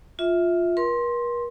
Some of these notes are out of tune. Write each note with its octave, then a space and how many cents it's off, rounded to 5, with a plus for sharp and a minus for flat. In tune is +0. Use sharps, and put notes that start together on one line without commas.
F4 +5 E5 -10
A#4 +45 C6 +10